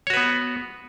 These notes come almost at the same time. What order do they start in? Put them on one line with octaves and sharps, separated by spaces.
C#5 F#4 B4 B3